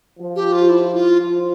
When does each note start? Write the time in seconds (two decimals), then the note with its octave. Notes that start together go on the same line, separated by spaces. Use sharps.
0.19 F3
0.36 G4
0.53 F4
0.69 E4
0.95 F4
1.20 F3